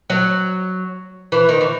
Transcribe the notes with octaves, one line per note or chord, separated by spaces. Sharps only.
F#3
E3
D#3
E3